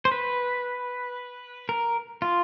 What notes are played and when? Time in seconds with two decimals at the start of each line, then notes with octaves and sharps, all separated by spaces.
0.05 C5
0.12 B4
1.69 A#4
2.22 F4